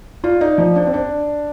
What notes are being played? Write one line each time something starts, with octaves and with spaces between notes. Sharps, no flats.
F4 D5
D#4 D5
F3 D5
D4 D5
C4
D4 D5